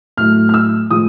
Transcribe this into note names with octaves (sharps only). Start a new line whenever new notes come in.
A2 F#3 A3 F6
F6
E6
A2 F3 G#3 D#6